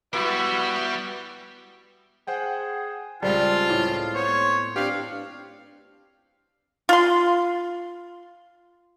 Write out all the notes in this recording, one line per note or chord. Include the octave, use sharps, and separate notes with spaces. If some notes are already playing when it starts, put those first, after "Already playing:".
G3 B3 E4 F#4 G4
G#4 C5 F#5 G5
C#2 G3 G#3 C4 F4 A4
A2
B3 C5 C#5
G2 C4 D4 G4 F5
F4 C6